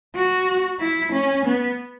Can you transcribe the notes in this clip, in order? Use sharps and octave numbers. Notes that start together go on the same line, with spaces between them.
F#4
E4
C#4
B3